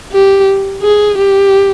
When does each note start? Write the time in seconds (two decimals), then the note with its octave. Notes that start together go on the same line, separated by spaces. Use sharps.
0.12 G4
0.82 G#4
1.18 G4